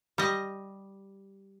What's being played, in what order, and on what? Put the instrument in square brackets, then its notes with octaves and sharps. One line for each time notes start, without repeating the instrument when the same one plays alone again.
[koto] G3 D#5